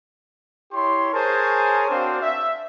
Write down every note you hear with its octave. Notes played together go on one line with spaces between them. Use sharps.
E4 G4 C#5 C6
G#4 A#4 C5 C#5 G#5 A5
C4 D4 F#4 C5 D5 F5
E5